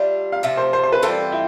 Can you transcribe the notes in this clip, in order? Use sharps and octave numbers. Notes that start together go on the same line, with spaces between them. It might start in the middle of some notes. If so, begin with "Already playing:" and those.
Already playing: G3 D4 F4 E5
F5
C3 F3 A3 E5
C5
C5
C5
B4
E3 G3 C4 F4 A4
E4